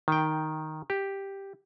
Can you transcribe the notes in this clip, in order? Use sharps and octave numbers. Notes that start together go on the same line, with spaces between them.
D#3 G5
G4